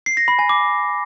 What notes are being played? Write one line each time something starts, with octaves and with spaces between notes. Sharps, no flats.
C7
A#6
B5
G#5
D6